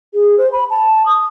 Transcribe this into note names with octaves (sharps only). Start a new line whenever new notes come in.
G#4
C5
B5
A5
D#6